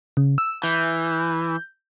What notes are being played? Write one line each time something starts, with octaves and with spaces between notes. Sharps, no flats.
C#3
E6
E3 G6